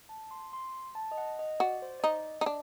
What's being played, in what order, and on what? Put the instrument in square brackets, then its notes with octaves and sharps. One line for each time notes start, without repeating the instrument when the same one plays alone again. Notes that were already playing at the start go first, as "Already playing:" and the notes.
[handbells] A5
C6
C6
A5
D#5
F#5
D#5
[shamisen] F#4 [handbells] D5
[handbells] C5
D5
[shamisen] D#4 [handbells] D#5
[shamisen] D#4
D4